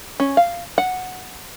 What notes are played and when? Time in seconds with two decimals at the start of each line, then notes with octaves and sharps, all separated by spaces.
0.20 C#4
0.37 F5
0.78 F#5